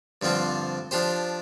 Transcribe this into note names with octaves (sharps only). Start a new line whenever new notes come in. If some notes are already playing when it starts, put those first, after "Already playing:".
G2 D3 F3 C4 F4
F3 D4 G4 C5